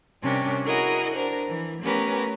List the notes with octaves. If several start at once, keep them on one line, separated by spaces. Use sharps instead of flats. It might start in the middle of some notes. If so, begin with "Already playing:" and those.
C3 G3 C#4 D4 G4 A#4
E4 F#4 G#4 A#4 D#5 F#5
D4 A#4 C5
E3
A3 B3 C#4 G4 A#4 B4